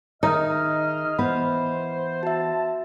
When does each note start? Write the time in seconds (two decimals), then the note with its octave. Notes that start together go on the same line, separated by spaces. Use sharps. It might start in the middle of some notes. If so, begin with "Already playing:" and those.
0.23 D#3 D#4 G#4 D#5 E5 F6
1.19 E3 B3 B4 C5 B5
2.23 F#4 E5 A5